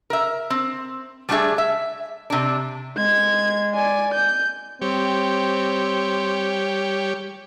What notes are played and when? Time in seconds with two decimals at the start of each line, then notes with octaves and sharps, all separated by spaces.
0.10 A#4 E5
0.50 C4
1.29 G3 A3 D4 G4 G#4 E5
1.58 E5
2.30 C3 D4
2.97 G#3 G#6
3.75 D5 G#5
4.14 G6
4.81 G3 C4 G4 C#5